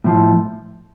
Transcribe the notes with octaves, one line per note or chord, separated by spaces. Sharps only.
A2 F3